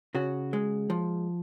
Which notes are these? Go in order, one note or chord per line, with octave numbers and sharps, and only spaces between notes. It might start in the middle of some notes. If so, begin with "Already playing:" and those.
C#3 F#4
G#3
F3